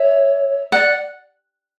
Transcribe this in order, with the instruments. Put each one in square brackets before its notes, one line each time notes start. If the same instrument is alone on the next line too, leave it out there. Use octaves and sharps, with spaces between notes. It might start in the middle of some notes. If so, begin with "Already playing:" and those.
Already playing: [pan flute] C#5 [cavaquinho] E5
[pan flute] D5 [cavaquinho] F#5